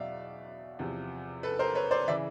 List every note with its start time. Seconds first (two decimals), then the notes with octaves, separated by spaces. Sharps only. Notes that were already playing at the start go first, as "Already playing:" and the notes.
Already playing: E2 B2 F#3 D5 E5 F5
0.79 E2 C3 F3
1.43 A4 B4
1.59 A#4 C5
1.75 B4 C#5
1.91 C5 D5
2.07 C#3 E3 D5 E5